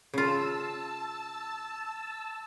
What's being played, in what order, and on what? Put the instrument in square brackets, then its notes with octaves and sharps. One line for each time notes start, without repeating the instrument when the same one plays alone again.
[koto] C#3 F4 [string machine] A5 E6